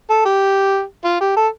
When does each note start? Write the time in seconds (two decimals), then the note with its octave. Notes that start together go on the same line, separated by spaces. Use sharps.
0.10 A4
0.25 G4
1.05 F4
1.21 G4
1.36 A4